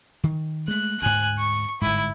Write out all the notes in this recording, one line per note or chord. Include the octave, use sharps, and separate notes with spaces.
D#3
G#3 A3 F#6
D2 G#2 G#5 F#6
C#6
G1 G#2 E4